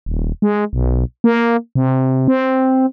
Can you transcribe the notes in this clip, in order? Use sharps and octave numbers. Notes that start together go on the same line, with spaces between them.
D#1
G#3
B1
A#3
C3
C4